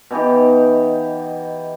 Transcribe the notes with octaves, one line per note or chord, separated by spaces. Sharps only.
B2 E3 D#4 G4